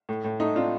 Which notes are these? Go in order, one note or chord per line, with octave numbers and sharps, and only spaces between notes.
A2
A2
A3 D#4
C4 D4 F4